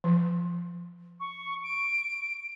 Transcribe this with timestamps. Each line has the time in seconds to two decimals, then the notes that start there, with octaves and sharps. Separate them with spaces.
0.04 F3
1.20 C#6
1.63 D7